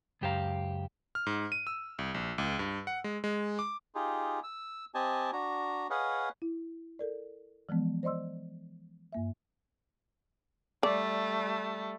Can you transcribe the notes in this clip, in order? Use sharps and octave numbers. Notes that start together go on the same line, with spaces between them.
C#2 F#2 G4 C5 F5 A#5
F6
G#2
D#7
E6
C2
A#1
C#2
G2
F#5
G#3
G#3
D6
D#4 F4 G4 G#4
E6
C4 G4 D#5 G#5 A5
D4 F#4 A#5
G#4 B4 C#5 D#5 F5 F#5
E4
A4 A#4 D5
E3 F3 G#3 B3
C5 D5 D#5 C6 E6
G2 A#3 E5
G3 A3 D5